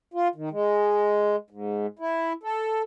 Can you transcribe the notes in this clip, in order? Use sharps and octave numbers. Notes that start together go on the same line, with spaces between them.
F4
D#3
G#3
G#2
E4
A4